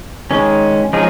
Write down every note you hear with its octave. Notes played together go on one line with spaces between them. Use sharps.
D#3 G#3 C#4
F3 G#3 C#4 D#4 G#4